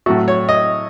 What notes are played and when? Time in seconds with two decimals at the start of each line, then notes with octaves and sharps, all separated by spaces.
0.06 A2 F#3 A3 F#4
0.28 C#5
0.49 D#5